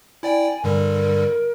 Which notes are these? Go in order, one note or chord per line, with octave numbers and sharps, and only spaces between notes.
E4 D5 G5 G#5
G2 D3 G3 A#4